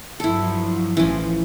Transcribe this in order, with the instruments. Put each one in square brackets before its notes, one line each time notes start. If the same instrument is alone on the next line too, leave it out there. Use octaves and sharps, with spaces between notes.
[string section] G2 F3 F#3 [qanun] E4 A4
[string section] A1 F3 [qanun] E3 C#4